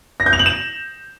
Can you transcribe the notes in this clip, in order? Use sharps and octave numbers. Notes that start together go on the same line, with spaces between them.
A#6
G6
F7
F#7
E7